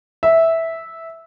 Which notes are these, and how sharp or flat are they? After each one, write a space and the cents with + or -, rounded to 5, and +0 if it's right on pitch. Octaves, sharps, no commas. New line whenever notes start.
E5 -10